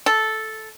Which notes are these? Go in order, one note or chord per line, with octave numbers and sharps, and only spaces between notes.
A4